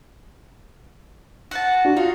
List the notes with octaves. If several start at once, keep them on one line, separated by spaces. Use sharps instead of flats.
F#4 F#5 A5
D4 F#4
D#4 F4 F5